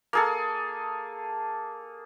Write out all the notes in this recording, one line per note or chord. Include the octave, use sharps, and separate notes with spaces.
A#3 G#4 A4